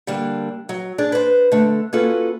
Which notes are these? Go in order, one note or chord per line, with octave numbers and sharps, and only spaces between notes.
D3 G3 A#3 D4
F#3
D4 G#4 D5
B4 C5
D3 A3
A#3 C#4 F4 F#4 A4 B4